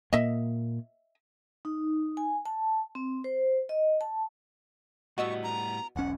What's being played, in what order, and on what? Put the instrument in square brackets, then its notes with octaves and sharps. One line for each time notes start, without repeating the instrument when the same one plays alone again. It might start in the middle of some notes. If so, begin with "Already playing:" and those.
[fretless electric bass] A#2 A#3 [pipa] D#5 E5
[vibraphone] D#4
G#5
A5
C4
C5
D#5
A5
[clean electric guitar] A2 G3 B3 [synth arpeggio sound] F#4 D#5 E6 [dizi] C#6
[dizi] A#5
[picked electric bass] E1 B1 C#4 [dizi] F#5